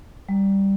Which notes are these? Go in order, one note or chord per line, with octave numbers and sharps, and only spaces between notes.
G3